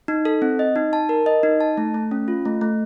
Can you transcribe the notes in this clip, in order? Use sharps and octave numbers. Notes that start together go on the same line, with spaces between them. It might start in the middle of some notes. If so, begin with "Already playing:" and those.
D#4
A4
C4
D#5
D#4
A5
A#4
D#5
D#4
A5
A3
A3
C#4
F4
A3
A3